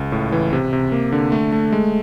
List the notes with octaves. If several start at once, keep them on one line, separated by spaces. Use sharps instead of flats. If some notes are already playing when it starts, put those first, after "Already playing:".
Already playing: C#2
A2
E3
C3
C3
A#3
D3
A3
A3
G#3